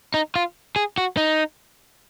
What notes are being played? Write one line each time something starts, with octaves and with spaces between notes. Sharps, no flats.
D#4
F4
G#4
F#4
D#4